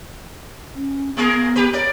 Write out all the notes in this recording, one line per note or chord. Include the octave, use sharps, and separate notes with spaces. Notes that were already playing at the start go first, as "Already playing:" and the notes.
C#4
A3 B3 G#4 A#4
B3
G4 B4
A#4 C#5 D5